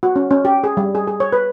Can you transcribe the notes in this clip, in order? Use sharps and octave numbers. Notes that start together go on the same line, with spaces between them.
F#4
C#4
C#4
G4
G#4
G3
G#4
G#4
C#5
B4